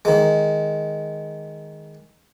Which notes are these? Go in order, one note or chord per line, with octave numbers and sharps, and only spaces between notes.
D#3 G#3